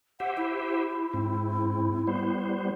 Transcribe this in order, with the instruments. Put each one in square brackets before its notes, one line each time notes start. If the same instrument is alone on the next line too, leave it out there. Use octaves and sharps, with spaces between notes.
[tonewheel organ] G4 C5 E5 [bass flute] F#5
[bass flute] E4
[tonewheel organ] G#2 C4
G3 B3 C5